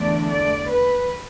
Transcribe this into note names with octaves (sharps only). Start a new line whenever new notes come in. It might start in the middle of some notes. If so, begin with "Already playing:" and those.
Already playing: E2 D3 A3 D4 D5
D5
B4